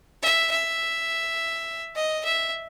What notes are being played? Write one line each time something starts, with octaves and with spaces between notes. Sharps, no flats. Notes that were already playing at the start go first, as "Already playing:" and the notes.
E5
E5
D#5
E5